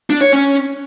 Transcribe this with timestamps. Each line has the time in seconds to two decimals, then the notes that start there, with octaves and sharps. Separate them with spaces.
0.10 D4
0.21 C#5
0.32 C#4